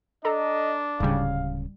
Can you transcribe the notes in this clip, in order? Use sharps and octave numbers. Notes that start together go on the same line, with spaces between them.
D4 A4 D#5 A#5
D1 G#2 C#3 G3 F5